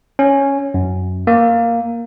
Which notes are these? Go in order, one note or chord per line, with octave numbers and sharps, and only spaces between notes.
C#4
F#2
A#3